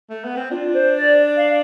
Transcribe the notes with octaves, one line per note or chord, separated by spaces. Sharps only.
A3
B3
C4
D4 F4
C5
D5
F5